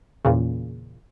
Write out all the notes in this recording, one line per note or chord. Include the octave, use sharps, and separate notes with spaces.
E2 A#2 C#3